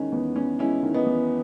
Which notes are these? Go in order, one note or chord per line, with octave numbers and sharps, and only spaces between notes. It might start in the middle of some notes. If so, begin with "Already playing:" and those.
Already playing: E2 D#3 G#3 C#4
E2 B3
E2 C#4
G#3 C#4 E4
D#3
B3 D#4
E2